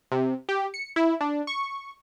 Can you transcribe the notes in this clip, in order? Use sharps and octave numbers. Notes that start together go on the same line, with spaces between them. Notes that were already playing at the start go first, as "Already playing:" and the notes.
C3
G4
C#7
E4
D4
C#6